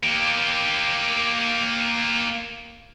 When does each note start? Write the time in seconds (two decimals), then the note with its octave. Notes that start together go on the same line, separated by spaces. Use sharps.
0.03 A#3 G4